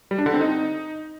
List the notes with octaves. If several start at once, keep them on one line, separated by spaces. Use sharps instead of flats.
G3
D4
D3
C4
D#4